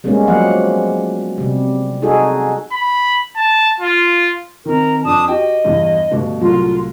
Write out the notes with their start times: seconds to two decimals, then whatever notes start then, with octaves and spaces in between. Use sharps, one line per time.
0.04 G3 G#3 A#3 B3 C#4
0.27 F3 F#3 A#3 F5 F#5
1.38 C3 G3
2.02 D#4 F#4 G#4 A4
2.72 B5
3.36 A5
3.80 F4
4.65 D#3 C4 A#4
5.05 F2 D4 A5 D#6
5.28 F#4 G4 D#5 G5
5.64 E2 G2
6.11 D2 G2 B2
6.41 C2 A2 F#3 F4